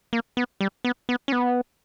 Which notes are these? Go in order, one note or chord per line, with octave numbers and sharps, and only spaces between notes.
A#3
B3
G3
B3
B3
C#4
B3